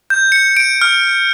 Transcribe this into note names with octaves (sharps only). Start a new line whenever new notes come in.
G6
C#7
D7
F6